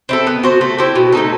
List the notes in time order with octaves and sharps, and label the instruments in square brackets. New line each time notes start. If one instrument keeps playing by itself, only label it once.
[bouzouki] C4 E4 A4
B3
F#4 C5
A3
E4 G4 C5
B2
A3 D#4 A4